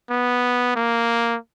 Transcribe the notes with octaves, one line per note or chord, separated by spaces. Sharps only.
B3
A#3